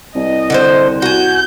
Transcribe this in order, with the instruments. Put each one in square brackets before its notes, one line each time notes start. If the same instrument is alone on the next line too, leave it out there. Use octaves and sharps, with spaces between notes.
[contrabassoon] C2 [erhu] D#5
[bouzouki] D3 A4 C5
[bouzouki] F#4 G#5 [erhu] G6